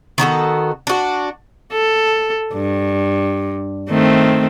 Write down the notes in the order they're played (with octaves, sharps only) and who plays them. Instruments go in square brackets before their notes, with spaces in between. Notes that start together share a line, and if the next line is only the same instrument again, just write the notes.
[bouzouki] D#3 B3 F#4 A4
D4 F#4
[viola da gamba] A4
G2
D#3 A3 C4